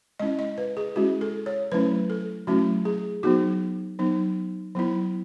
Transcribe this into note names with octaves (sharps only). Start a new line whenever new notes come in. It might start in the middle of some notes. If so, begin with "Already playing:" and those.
G#3 C#4 E4 D#5
D#5
B4
G#4
G#3 C#4 E4 F#4
A4
C#5
F#3 A3 C#4 E4 B4
A4
F#3 A3 C#4 E4 F#4
G#4
F#3 B3 D#4 F#4
F#3 B3 D#4
F#3 B3 E4